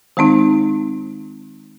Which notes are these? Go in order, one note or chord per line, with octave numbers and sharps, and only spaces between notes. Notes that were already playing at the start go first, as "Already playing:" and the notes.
D#3 G#3 C4 D#4